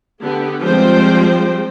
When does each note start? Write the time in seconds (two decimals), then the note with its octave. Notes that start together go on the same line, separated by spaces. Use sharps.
0.22 D3 B3 G4
0.62 F3 G3 G#3 C4 C5 G5